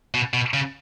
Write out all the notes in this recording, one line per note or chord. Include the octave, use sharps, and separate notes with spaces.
B2
B2
C#3